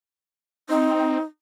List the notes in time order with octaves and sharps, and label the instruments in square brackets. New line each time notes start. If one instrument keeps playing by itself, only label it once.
[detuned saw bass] C4 [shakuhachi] D#4